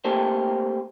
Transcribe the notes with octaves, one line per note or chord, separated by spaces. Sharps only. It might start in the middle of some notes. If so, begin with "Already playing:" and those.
A3 A#3 C4 G4 A4